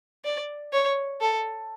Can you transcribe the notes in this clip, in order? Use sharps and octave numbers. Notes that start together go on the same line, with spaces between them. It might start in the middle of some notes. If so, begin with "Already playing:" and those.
D5
C#5
A4